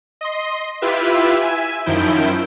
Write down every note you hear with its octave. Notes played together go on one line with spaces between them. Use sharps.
D#5 C6
E4 F4 G4 B4 E5
E5 G#5
F#2 D#3 F3 E4 G6 D7